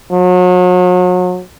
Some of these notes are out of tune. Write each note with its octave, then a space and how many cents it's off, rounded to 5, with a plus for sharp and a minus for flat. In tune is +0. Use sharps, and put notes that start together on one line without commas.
F#3 -35